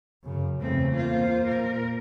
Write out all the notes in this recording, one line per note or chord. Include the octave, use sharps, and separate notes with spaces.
F#2 C#3
E2 C#3 A3 C4
A#3 F4 C5
A#2 A#4